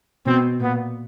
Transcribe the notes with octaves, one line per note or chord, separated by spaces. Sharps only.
B2 C4
A#2 B3